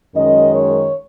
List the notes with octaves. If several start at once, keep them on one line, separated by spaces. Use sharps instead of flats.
F#2 D#3 G#3 C#4 D#5
C#5